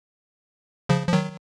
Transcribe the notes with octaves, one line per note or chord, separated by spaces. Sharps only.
C#3 F3
F3
D#3 F#3